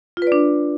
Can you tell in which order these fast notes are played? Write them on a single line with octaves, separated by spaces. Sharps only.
F4 B4 D5 D4